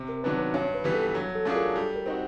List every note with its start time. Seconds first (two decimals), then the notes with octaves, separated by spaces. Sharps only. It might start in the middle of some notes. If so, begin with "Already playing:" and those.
Already playing: C3
0.09 A#4
0.24 D#3 F#3 B3 D4 B4
0.39 B4
0.54 G2 C#5
0.75 B4
0.84 E3 G3 B3
0.94 A4
1.15 F#3
1.35 A4
1.45 A3 D4 F4 G#4
1.55 A#4
1.76 G3 A4
1.96 A#4
2.06 C4 D#4 F#4